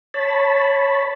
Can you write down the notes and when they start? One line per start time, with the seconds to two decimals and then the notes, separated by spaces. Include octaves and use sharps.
0.14 C#5 A5 B5